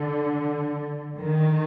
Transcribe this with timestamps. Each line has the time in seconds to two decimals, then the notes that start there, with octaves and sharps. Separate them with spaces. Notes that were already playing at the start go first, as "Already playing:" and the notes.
Already playing: D3
1.18 D#3